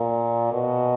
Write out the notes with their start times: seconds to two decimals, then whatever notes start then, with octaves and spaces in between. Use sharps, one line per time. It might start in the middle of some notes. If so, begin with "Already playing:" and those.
Already playing: A#2
0.53 B2